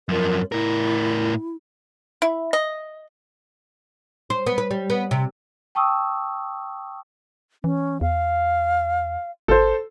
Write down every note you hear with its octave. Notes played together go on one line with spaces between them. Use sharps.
F#2 F3 A#4
A2 E4 A#4
E4
D#5
C5
B3
B4
G3
B3
C3
G5 A5 C#6 D#6 E6
E3 C#4
E2 F5
G#1 A4 C5